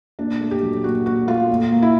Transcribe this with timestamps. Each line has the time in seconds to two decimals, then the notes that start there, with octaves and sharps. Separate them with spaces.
0.19 A#2 D4
0.41 A3
0.51 G4
0.62 F#3
0.84 A#2 F#4
1.06 A#2 F#4
1.27 A3 F4
1.49 A#2
1.71 A#3
1.82 E4